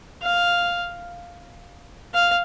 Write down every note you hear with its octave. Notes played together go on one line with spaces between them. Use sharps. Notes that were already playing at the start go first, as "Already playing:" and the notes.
F5
F5